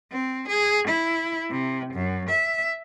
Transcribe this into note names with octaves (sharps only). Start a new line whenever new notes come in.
C4
G#4
E4
C3
F#2
E5